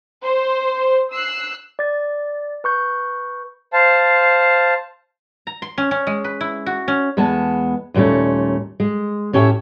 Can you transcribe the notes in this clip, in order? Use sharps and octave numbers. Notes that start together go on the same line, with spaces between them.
C5
E6 F#6 C7
D5 A6
B4 C#6 G6
C5 F5 A5
A#5
C6
C#4
C#4
G#3
B4
E4
F#4
C#4
E2 G#3 B3 A5
D#2 A#2 G3 A3 C#4
G#3
A2 C#4 G4 C#5 E5